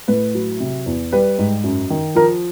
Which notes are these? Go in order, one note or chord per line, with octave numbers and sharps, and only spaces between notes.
A2 B4
F#3
C3
E2
G3 B4
G#2
F#2
D#3
F3 A#4